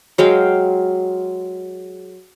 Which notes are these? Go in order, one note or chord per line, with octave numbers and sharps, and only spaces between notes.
F#3 G#3 F5 G5